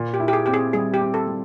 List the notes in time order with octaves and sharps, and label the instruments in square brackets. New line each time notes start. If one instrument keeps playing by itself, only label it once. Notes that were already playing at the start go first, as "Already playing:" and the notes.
Already playing: [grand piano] A#2
[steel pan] G4
[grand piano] E4
[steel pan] G4
G#4
[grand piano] C4 [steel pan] G4
[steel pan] G#4
[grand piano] G3 [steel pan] G#4
[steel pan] G4
[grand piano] C4
[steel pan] A4
[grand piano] G3